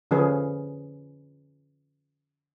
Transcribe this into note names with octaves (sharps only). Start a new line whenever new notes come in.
D3 F3 C#4 G#4 B4